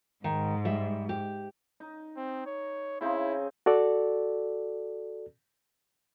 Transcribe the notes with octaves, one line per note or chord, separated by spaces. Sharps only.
G#2 D#3
G3 E5
G4
D#4
C4
C#5
C#3 C4 D#4 E4
F#4 A4 D5